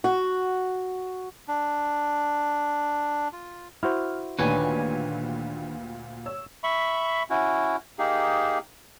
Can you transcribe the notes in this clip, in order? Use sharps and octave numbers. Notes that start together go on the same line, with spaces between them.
F#4
D4
F4
E4 F#4 C5 F6
D2 A#2 D#3 D4 G4 B4 C#5 G#5
C#5 E6
E5 B5 C#6
C#4 E4 F#4
A#3 D#4 G4 G#4